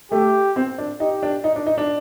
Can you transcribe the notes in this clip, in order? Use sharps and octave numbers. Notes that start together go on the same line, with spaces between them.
A3 G4
C4
D4
D#4 G4
D4
D#4
D4
D#4
D4